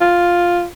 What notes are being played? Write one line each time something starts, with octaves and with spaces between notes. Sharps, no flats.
F4